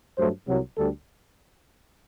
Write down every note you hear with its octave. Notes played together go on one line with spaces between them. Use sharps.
G2 F#3 A3 C5
C2 C3 F#3
D2 D3 G3 A4